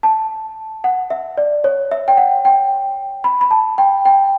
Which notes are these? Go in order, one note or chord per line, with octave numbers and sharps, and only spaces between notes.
A5
F#5
E5
D5
C#5
E5
G5
F#5
G5
B5
B5
A5
G5
G5